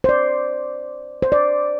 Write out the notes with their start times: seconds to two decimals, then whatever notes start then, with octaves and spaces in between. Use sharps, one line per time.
0.04 C5
0.09 D5
1.22 C5
1.32 D5